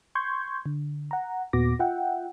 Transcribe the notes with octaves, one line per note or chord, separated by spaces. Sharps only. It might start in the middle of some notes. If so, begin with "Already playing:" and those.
C6 C#6 G6 G#6
D3
F#5 A#5
D#2 A#2 B3 F#4 D6 A#6
F4 E5 F#5 G5